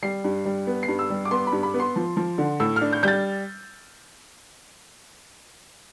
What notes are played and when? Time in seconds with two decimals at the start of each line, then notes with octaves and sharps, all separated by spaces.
0.02 G3 C7
0.24 G2
0.45 G3
0.67 B3
0.83 C7
0.88 G2
0.99 E6
1.10 G3
1.25 D6
1.31 B3 C6
1.47 B5
1.52 G2
1.63 B5
1.74 B3
1.80 C6
1.96 F3
2.17 F3
2.38 D3
2.60 A2 E6
2.76 F6
2.81 D4
2.92 G6
3.03 G3 G6 A6